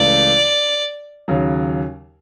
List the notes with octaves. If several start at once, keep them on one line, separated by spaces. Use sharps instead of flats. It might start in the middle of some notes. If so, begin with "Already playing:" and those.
Already playing: C#2 C#3 E3 A3 D5
D#2 C#3 F#3